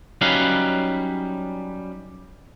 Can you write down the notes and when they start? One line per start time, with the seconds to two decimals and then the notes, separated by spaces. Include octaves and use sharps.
0.21 F#3 G3 C#4 D#4 B4 F5